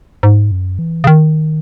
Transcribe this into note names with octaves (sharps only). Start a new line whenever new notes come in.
G#2
F#2
E3
C#3
D#3